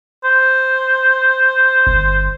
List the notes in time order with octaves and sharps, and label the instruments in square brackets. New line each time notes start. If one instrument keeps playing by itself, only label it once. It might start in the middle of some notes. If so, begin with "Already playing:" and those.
[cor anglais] C5
[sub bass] G1